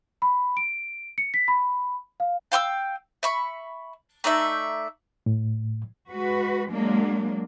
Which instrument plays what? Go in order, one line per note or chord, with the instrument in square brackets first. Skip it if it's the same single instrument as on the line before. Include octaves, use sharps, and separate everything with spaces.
[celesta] B5
D7
C#7
B6
B5
F5
[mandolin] F5 G5 C6 E6
E5 B5 C#6
A3 D#4 D5 E5
[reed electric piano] A2
[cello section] G#3 F#4 B4
F#3 G#3 A#3 D4